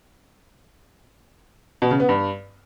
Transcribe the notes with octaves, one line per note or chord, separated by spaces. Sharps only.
B2
C#3
B3
G2